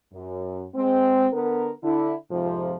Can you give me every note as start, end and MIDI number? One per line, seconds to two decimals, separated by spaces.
0.13 0.63 42
0.75 1.26 56
0.75 1.26 60
1.32 1.69 50
1.32 1.69 59
1.32 1.69 70
1.83 2.13 50
1.83 2.13 64
2.30 2.74 41
2.30 2.74 44
2.30 2.74 48
2.30 2.74 53